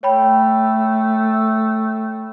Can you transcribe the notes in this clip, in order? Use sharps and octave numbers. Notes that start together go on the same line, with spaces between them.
A3 C#5 G5 B5